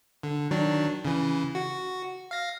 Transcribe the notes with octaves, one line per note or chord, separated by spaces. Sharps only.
D3
D#3 F#3 D4
C#3 E3
F#4
F5 A#6